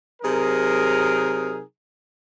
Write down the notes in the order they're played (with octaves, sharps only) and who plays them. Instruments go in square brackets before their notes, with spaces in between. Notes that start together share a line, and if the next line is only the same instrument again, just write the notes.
[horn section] C3 F#3 D#4 G#4 A#4